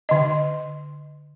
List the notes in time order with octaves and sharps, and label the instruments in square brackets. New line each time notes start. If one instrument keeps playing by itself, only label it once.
[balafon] D3 D#5